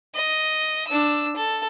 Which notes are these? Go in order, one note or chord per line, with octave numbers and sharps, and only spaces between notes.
D#5
D4 E6
A4